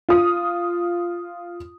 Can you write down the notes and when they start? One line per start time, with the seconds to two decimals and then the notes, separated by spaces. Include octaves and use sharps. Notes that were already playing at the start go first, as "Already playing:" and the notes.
0.09 F4 D#6